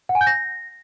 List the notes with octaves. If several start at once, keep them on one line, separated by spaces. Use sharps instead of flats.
F#5
G#5
G6
A#6